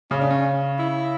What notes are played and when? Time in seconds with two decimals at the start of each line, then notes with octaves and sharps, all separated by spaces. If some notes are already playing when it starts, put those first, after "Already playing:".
0.11 C#3 C#4
0.20 D4
0.30 C#4
0.79 E4